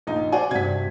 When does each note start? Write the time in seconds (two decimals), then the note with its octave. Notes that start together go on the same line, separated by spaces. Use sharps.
0.07 A#1 D#4
0.32 F#4 C5 D5 F#5 G#5
0.51 G2 C3 G#6 B6